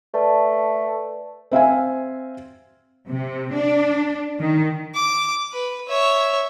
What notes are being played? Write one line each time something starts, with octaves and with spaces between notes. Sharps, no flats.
A3 B4 D5 A5
C4 E5 F5 G#5
C3
D4
D#3
D6
B4
C#5 E5